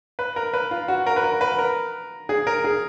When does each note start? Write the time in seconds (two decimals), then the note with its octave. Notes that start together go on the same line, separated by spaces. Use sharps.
0.19 B4
0.36 A#4
0.53 B4
0.71 F4
0.88 F#4
1.06 A#4
1.16 B4
1.24 A#4
1.41 B4
1.59 A#4
2.29 G#4
2.47 A#4
2.64 G#4